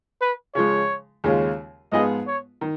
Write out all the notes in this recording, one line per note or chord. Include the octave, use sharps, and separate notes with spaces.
B4
C#3 F3 G#3 C#5
D#2 C#3 G#3 C#4 F4
G#2 F3 B3 F4 G#4 D#5
C#5
D#3